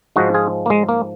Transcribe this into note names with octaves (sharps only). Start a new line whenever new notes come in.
G#2 F3 G#3 D#4 F#4
F4 G#4
A#3
G#3
A#3